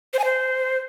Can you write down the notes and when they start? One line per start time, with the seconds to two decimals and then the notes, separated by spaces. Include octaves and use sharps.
0.13 C5
0.19 G#5
0.24 C5